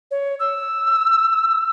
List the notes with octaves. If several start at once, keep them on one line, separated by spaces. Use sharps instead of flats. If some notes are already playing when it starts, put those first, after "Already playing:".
C#5
E6